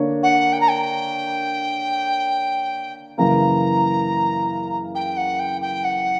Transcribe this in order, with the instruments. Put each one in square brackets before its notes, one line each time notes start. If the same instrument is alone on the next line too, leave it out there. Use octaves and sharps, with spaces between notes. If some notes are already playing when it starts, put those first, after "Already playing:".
Already playing: [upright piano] D3 A#3 D4 A#4 C#5
[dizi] F#5
G5
A#5
G5
[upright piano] F#2 C#3 E3 A#3 [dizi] A#5
[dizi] G5
F#5
G5
G5
F#5